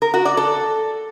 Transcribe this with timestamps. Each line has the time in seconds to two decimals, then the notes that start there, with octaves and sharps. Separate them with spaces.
0.02 A#4
0.14 F#4
0.25 D5
0.37 A4